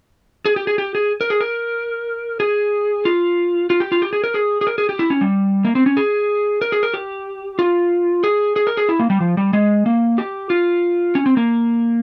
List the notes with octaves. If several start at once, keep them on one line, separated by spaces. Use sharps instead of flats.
G#4
G4
G#4
G4
G#4
A#4
G#4
A#4
G#4
F4
F4
G4
F4
G4
G#4
A#4
G#4
G#4
A#4
G#4
G4
E4
C#4
G3
A#3
C4
C#4
G#4
A#4
G#4
A#4
G4
F4
G#4
G#4
A#4
G#4
E4
A#3
G3
F3
G3
G#3
A#3
G4
F4
C#4
C4
A#3